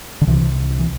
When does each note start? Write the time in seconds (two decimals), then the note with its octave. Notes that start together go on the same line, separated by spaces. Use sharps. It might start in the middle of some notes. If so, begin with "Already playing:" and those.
0.21 D3
0.27 C2 C3 E3
0.79 E3